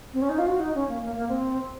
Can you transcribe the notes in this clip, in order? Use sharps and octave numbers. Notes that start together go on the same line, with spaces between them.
C4
C#4
D#4
F4
F#4
D#4
C#4
A#3
A#3
A#3
C4